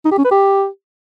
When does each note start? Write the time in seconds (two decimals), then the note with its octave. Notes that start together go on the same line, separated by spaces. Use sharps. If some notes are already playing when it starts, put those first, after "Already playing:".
0.05 D#4
0.12 G4
0.18 C#4
0.25 B4
0.31 G4